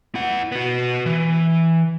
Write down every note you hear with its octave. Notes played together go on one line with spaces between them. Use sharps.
E4 F#5
B3 F#4
E3